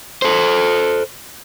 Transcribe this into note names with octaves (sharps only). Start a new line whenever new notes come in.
A4 C5